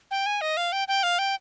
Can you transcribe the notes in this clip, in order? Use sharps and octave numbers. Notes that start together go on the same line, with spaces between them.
G5
G#5
D#5
F5
G5
G5
F5
G5